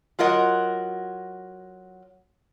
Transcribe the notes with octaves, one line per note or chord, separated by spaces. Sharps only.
F#3 F4 F#4 A#4 D#5 F#5